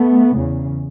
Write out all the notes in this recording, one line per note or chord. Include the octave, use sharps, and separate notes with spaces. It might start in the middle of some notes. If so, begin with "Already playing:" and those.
Already playing: A3 B3
E2 C#3